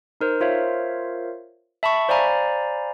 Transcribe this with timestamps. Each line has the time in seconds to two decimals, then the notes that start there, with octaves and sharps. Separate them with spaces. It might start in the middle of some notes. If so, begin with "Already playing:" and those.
0.21 D#4 A#4 C5
0.41 F4 A#4 C5 C#5 E5 F5
1.83 E5 A5 B5 C#6
2.09 C5 D5 F5 G#5 A#5 B5